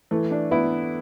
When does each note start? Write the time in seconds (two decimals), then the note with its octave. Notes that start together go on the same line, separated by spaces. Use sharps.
0.11 E3 A3
0.31 D4
0.51 B3 E4